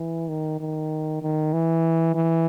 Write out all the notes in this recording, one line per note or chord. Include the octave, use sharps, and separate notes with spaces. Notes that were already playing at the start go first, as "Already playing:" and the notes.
Already playing: E3
D#3
D#3
D#3
E3
E3